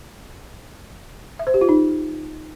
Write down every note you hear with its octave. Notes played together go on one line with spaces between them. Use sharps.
E5
C5
G4
F4
D#4